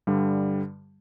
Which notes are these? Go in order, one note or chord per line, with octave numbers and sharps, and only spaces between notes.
G2 D3 G3